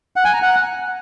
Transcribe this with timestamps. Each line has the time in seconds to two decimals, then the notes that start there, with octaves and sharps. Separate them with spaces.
0.16 F#5
0.25 G#5
0.33 A#5
0.42 F#5